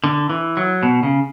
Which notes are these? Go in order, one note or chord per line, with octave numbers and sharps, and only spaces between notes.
D3
E3
F#3
B2
C#3